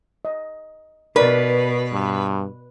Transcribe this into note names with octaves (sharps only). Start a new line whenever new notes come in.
D#5
B2 A#4 B4 D5
G2